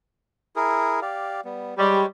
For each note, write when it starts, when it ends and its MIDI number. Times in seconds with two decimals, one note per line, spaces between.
0.56 1.00 64
0.56 1.00 68
0.56 1.00 70
1.02 1.41 67
1.02 1.41 74
1.02 1.41 77
1.45 1.74 55
1.45 1.74 59
1.78 2.02 55
1.78 2.06 56
1.78 2.06 73